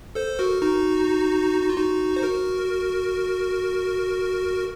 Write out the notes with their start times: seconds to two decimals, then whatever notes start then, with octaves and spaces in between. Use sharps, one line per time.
0.15 A4 C5
0.39 F#4 A#4
0.62 D#4 F#4
1.62 D#4
1.69 F4
1.76 D#4 F#4
2.16 C5
2.22 F#4 A#4